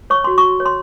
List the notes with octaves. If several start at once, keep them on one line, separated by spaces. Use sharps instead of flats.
C#5 C#6
F#4 C6
F#4 C#6
C#5
C6